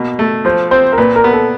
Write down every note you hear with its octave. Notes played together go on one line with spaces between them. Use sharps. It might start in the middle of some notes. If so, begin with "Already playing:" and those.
Already playing: B2 A#3
A3
F3 C5
C4 C5
A#4
A#2 B4
A#4
B3
A4